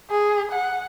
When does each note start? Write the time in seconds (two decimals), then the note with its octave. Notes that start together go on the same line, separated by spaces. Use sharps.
0.10 G#4
0.52 F#5